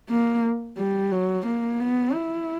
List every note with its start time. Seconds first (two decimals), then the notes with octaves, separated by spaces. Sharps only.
0.09 A#3
0.77 G3
1.12 F#3
1.46 A#3
1.80 B3
2.14 E4